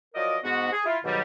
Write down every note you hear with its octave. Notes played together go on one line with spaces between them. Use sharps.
F3 F#3 A#4 D5 D#5
G#2 B3 F#4
G#4
E4 F4
G#2 B2 D#3 F#3 G3